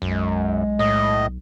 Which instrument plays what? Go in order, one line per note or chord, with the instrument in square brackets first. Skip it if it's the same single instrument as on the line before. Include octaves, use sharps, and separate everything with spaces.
[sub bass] B1 [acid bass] F#2 [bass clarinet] G#3
[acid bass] A2 [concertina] D#5